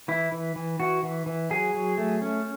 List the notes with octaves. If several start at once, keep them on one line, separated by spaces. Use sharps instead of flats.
E3 E4
E3
E3
E3 F#4
E3
E3
F#3 G#4
F#3
A3
C#4